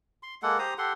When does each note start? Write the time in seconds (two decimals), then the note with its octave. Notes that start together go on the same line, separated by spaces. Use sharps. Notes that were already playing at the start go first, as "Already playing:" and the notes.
0.23 C6
0.43 G#3 A#3 A4 F#5
0.59 G4 C5 A#5 D#6
0.78 G4 A4 F#5 C6